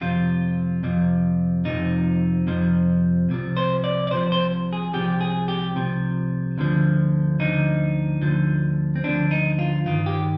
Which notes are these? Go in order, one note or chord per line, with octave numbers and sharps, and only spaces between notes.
F2 C3 F3 F4
F2 C3 F3
F2 C3 F3 D#4
F2 C3 F3
C2 C3 F3
C5
D5
D5
C2 C3 F3 C5
C5
G#4
C2 C3 F3 G4
G#4
G4
C2 C3 F3
D2 D3 F3
D2 D3 F3 D#4
D2 D3 F3
C4
D2 D3 F3 D4
D#4
F4
G2 D#3 F4
G4